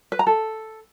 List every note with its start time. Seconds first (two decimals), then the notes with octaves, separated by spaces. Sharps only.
0.12 B4
0.19 A#5
0.27 A4